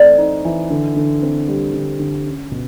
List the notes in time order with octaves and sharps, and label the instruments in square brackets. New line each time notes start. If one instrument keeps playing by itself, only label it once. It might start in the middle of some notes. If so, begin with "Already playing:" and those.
Already playing: [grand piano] E3 A3 C4 [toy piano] D5
[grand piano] D#4
E3
D3
D3
C4
G3
D3
D3
C#4
B2